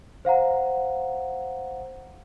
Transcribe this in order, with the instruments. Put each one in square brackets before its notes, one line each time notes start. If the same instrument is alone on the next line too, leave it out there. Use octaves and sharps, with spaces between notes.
[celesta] C5 F5 F#5 A#5